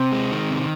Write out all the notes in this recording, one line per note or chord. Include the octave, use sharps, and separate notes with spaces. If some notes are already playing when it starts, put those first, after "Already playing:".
Already playing: C3 C4
G#3
D#3
C3